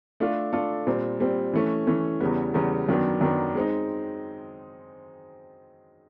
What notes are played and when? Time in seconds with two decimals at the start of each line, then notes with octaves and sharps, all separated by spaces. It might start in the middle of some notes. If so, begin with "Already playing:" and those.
0.20 A3 D4 F4 A4
0.53 A3 D4 F4 A4
0.87 A#2 G3 C4
1.20 A#2 G3 C4
1.54 E3 A3 C#4
1.87 E3 A3 C#4
2.20 E2 C#3 E3 G3 B3
2.54 E2 C#3 E3 G3 B3
2.89 F#2 D#3 F#3 B3 D4
3.21 F#2 D#3 F#3 B3 D4
3.55 G#3 C4 D#4